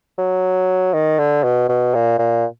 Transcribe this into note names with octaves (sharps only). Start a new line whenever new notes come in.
F#3
D#3
D3
B2
B2
A#2
A#2